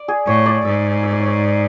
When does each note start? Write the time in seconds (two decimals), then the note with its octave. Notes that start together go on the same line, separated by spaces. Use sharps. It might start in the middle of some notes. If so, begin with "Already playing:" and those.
Already playing: D5
0.08 G#4
0.27 A2 C#5
0.46 D5
0.65 G#2 E5
1.03 E5
1.12 D5
1.20 C#5
1.27 D5